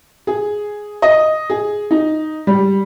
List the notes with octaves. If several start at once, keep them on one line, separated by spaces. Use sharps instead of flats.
G#4
D#5
G#4
D#4
G3